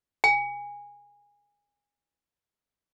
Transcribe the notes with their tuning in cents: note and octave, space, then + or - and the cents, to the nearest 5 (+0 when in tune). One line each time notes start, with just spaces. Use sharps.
G#5 -20